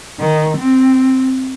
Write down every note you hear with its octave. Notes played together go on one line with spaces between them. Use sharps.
D#3
C4